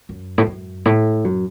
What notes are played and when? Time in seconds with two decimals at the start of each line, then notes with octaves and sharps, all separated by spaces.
0.09 F#2
0.38 A2
0.47 F#2
0.85 A2
1.24 F#2